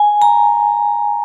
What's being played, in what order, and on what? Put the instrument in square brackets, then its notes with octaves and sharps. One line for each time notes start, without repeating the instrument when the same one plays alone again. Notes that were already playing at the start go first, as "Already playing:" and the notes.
Already playing: [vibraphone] G#5
A#5